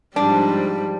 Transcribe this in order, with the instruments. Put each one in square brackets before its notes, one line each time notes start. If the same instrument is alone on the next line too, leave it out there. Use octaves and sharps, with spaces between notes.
[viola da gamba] G#2 F3 G3 [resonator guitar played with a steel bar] D4